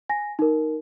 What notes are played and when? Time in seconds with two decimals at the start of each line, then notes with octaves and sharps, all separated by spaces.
0.09 G#5 A#6
0.39 D#4 A#4